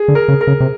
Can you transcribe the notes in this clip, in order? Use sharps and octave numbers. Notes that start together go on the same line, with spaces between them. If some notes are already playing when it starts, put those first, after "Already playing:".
Already playing: G#4
D3
A#4
C#3
A#4
C#3
C3